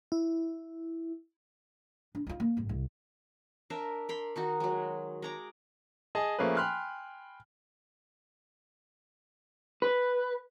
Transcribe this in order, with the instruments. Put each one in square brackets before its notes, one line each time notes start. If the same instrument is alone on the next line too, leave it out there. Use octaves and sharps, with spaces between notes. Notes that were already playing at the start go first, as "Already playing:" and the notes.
[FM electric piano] E4
[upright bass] D4
D#4 F4
A#3
G#1 G2
C2
[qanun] D4 A#4 E5
A#4 B5 C6
D#3 D#4 F#4
F#3 G#3
G#3 A#5 D6
[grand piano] G#4 D#5 G#5 A5
F3 A3 A#3 C#4 G#4 B4
G5 G#5 B5 C6 F6 F#6
[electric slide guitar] B4